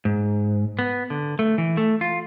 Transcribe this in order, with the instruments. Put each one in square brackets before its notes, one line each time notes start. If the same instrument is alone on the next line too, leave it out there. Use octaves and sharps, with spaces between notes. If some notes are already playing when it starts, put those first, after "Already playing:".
[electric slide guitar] G#2
B3
D3
A3
E3
A3
F4